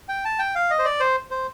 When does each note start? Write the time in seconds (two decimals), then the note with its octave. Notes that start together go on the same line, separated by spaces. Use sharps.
0.09 G5
0.25 A5
0.39 G5
0.55 F5
0.70 D#5
0.79 C5
0.85 D5
1.00 C5
1.31 C5